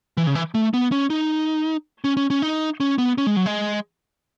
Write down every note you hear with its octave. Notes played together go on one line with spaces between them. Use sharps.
E3
C#3
E3
A3
B3
C#4
D#4
C#4
C#4
C#4
D#4
C#4
B3
C#4
G#3
F#3
G#3